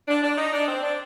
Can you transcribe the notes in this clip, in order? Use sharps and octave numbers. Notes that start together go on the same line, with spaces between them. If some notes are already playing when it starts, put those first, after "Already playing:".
D4
D4
D#4
D4
C4
D4